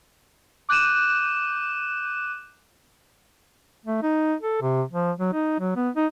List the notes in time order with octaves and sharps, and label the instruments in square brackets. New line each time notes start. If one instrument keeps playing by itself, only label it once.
[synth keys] D6 F#6 G6 D#7 E7
[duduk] A3
D#4
A4
C3
F3
F#3
D#4
F#3
B3
D#4